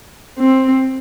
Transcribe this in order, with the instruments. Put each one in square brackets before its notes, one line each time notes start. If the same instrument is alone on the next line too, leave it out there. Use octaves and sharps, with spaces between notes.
[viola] C4